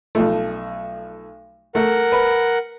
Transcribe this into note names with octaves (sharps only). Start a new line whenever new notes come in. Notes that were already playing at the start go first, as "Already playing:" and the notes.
B1 F3 A3
A3 A#4 F#5
B4